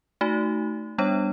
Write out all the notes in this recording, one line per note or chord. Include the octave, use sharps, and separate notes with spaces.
A3 D#4 F#4
G3 B3 D4 C#5